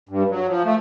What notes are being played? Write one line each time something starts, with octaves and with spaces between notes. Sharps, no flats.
G2
F#3
F3
A3